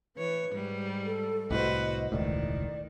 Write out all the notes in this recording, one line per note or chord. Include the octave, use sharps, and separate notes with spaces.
E3 B4 C#5
G#2 G3
A4
C2 A2 F#4 B4 C5 D#5
E1 C#2 A2 D#3 D5